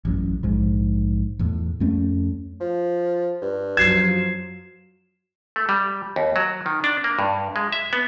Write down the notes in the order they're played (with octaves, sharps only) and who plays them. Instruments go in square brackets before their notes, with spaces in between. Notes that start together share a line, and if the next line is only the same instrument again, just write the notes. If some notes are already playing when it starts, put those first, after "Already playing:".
[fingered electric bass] A1 F#2
A#1 G#2
E2 A2
F2 A3 C#4
[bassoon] F3
G2
[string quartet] F#2 F3 F#3 [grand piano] G#6 [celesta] C7 E7
[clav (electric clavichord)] A3
G3
D#2
F#3
D#3
D4
A#3
G2
G#3
E5
B3